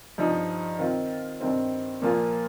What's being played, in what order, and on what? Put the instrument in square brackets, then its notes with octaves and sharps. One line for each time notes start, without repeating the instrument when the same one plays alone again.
[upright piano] G2 F3 D#4
D#3 C4 F4
G2 D#3 C4
A#2 F3 A#3 F4